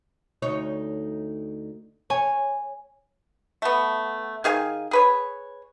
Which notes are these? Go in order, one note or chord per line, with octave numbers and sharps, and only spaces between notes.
D2 D#4 C#5
C#5 G#5
A3 B3
D#3 G#4 F5 G#5
G#4 B4 C#5